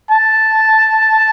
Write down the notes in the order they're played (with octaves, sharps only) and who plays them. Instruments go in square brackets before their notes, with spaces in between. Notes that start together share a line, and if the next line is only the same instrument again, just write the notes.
[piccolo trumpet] A5